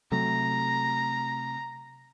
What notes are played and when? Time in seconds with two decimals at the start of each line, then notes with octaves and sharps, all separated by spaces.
0.12 C3 F#3 A3 A#5